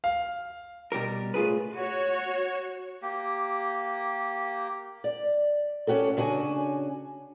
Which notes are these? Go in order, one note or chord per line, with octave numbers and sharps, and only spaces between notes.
F5
B2 G3 G4 A#4
A2 F4 G#4 B4
F#4 C#5
A#3 G4
D5
C#4 F#4 G4 A4
C#3 D4 F#4 D5 G#5